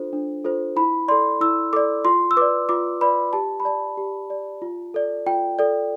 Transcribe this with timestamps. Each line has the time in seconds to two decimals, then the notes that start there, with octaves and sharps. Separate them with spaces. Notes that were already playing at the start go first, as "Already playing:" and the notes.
Already playing: D4 F4 A4 C5
0.13 D4
0.45 F4 A4 C5
0.76 E4 B5
1.08 A4 D5 C6
1.41 E4 E6
1.73 A4 D5 D6
2.05 F4 C6
2.31 E6
2.37 B4 D5 D6
2.69 F4 D6
3.01 B4 D5 B5
3.33 G4 A5
3.60 B5
3.65 D5 A5
3.97 G4
4.30 D5
4.62 F4
4.94 A4 D5
5.26 F4 G5
5.59 A4 D5